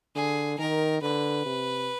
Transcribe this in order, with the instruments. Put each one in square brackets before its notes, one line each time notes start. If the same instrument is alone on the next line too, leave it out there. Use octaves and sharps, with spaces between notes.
[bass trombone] D3 [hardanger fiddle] G#4
[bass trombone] D#3 [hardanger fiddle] A#4
[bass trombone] D3 [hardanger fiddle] B4
[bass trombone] C3